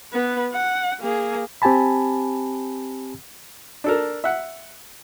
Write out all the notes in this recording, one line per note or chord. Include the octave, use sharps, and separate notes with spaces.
B3 B4
F#5
A#3 G#4
C4 G4 G#5 A5 B5
D4 A4 A#4
E5 F#5